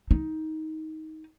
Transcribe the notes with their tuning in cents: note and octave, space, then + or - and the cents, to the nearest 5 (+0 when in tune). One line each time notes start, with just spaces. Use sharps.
D#4 +15